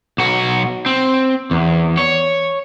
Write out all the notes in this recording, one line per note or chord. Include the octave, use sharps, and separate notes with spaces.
B1 F#4
C4
E2
C#5